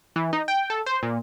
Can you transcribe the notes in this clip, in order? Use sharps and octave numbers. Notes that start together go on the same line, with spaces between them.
E3
D#4
G5
A4
C5
A#2